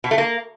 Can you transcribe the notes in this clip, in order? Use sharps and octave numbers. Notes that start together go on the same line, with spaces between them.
B2
A3
A#3